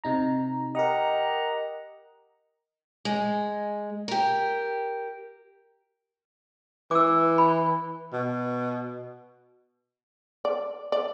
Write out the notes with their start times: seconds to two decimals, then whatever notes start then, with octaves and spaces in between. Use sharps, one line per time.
0.04 C3 D#4 A#5
0.75 G4 A#4 D#5 F#5 A#5
3.05 G#3
4.08 G4 A#4
6.91 E3 D6 E6
7.38 B5
8.13 B2
10.45 D5
10.92 D5